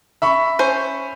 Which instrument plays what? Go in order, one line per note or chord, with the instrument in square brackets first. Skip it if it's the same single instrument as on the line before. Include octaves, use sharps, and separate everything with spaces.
[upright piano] E5 B5 C#6
[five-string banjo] C#4 C5